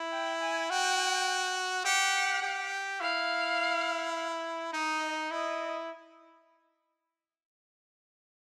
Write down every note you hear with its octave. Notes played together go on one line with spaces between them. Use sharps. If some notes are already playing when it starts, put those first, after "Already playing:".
Already playing: E4
G5
G#5
F#4 G5
G4 F#5
G4
E4 F5
D#4 D#5
E4 D#5